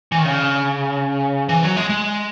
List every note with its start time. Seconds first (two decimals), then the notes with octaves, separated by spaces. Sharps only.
0.12 E3
0.18 D#3
0.25 C#3
1.49 E3
1.63 F#3
1.77 G#3
1.90 G#3